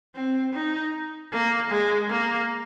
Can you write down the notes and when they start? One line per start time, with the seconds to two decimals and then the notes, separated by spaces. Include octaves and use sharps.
0.15 C4
0.54 D#4
1.32 A#3
1.70 G#3
2.10 A#3